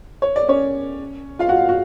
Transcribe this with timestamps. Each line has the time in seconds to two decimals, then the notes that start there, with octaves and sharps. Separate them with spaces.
0.22 C#5
0.36 D5
0.48 C#4 C#5
1.39 F4 F5
1.49 F#4 F#5
1.69 F#4